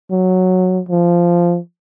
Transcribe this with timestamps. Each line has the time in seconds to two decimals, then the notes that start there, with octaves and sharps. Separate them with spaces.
0.11 F#3
0.89 F3